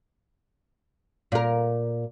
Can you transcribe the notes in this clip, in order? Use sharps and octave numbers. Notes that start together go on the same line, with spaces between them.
A#2 A#4